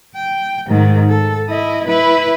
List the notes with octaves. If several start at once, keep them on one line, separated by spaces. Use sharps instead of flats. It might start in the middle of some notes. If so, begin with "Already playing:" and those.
G5
G#2 D#3
A4
E4 D#5
E4 B4